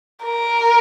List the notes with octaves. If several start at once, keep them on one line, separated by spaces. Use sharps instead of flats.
A#4